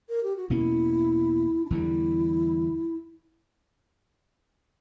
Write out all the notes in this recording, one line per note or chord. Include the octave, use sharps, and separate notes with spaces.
A#4
G4
F#4
E2 B2 A#3 C#4 E4
D4
E2 D3 G3 E4